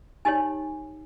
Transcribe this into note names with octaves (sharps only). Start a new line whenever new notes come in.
D#4 G4 C#5 G#5